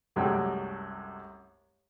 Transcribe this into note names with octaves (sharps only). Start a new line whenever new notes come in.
C2 F#2 C3 G#3 A3 G5